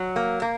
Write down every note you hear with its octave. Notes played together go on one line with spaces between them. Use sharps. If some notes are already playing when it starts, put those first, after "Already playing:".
Already playing: F#3
A#3
A#3